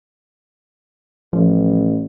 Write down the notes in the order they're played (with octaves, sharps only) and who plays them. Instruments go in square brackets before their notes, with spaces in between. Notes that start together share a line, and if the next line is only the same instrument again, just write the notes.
[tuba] A1 [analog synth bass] F3